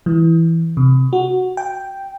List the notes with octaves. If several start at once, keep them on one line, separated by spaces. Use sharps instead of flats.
E3
C3
F#4
G5